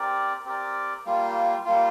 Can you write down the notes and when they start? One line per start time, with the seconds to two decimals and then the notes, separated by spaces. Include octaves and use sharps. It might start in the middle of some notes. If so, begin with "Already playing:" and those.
Already playing: C4 G4 A#4 D5
0.45 C4 G4 A#4 D5
1.06 G3 A#3 F4
1.65 G3 A#3 F4